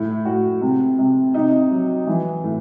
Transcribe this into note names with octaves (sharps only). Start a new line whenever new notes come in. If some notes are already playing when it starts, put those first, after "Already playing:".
Already playing: A2
A2 F#4
C3
C3
C3 D#4
F#3
E3
A2